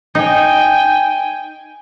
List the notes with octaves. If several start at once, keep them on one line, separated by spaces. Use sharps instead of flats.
D#4 G5 G#5